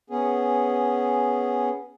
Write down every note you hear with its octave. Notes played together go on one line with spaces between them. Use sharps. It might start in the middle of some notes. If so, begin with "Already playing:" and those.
B3 C#4 G#4